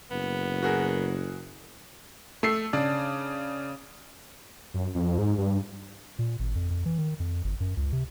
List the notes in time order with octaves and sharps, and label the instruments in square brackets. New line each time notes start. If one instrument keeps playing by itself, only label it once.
[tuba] F#1 [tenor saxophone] B3
[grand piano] F#4 G#4 A#4
[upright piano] A3 E6 C7
C#3 D4 D5
[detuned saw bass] F#2
F2
G#2
G2
[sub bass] A#2
G#1
F2
F2
E3
D#3
F2
G1
F#2
C#2
C3